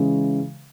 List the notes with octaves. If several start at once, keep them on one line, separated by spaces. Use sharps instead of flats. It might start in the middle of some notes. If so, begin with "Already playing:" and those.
Already playing: C#3 E3 G#3